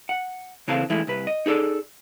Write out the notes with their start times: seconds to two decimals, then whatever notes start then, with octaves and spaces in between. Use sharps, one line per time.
0.09 F#5
0.68 C#3 E3 C4 A4 F5
0.90 E3 G#3 A3 E4
1.07 C2 B4
1.27 D#5
1.46 D#4 G#4 A4 D5